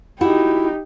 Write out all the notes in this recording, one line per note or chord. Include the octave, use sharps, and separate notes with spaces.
D#4 E4 F#4 G4 F#5